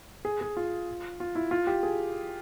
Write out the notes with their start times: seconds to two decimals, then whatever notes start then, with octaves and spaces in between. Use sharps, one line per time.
0.25 G#4
0.41 G#4
0.57 F4
1.20 F4
1.35 E4
1.51 F4
1.67 G4
1.83 G#4